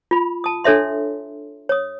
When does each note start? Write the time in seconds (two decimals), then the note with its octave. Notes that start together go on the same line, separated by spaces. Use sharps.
0.11 F4 B5
0.44 A5 D#6
0.64 D4 A4 C#5 E5 C6
1.69 C#5 D#6